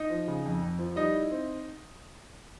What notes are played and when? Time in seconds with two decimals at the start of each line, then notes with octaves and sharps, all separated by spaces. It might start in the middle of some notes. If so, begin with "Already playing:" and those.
Already playing: D#4 D#5
0.10 F3
0.28 C#3
0.45 F2
0.62 F2
0.79 F3
0.96 G3 D#4 D#5
1.14 E4
1.31 C4